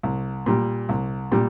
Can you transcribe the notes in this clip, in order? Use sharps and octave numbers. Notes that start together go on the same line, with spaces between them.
C2
A#2 G3
C2
A#2 G3